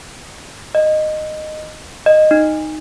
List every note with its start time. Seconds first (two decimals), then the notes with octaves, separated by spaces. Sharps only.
0.75 D#5
2.06 D#5
2.31 D#4